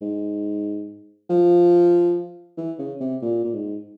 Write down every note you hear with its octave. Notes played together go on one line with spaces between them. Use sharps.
G#2
F3
E3
C#3
C3
A#2
A#2
G#2